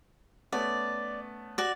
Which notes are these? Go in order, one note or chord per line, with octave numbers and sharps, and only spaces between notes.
A3 B3 C#4 D5
F#4 D5